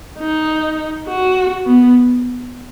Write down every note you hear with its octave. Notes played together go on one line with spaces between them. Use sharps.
D#4
F#4
B3